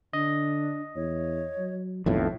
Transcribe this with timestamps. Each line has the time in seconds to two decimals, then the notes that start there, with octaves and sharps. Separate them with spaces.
0.13 D3 D4 D#5
0.96 E2 C#5
1.58 F#3
2.06 B1 F2 A2 D#3 A5